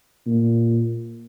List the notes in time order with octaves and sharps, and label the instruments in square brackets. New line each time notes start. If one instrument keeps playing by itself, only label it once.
[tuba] A#2